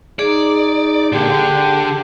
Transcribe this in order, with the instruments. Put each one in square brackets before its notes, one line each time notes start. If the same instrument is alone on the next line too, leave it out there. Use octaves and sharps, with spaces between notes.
[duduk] D#4 [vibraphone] G#4 [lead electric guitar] D5
[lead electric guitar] A#2 D3 [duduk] G4
[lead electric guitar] D3